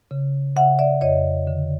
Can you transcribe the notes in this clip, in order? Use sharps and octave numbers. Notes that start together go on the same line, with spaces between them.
C#3
C#3 E5 F#5
D5 E5
F2 C#5 D#5
D3